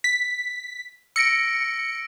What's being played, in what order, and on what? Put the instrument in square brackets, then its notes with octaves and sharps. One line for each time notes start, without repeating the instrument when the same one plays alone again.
[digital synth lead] B6
[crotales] E6 A#6 D7 [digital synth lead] C#7